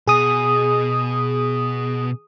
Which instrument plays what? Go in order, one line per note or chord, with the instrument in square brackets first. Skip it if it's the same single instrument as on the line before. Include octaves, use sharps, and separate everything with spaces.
[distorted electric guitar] B2 [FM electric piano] G#4 D#6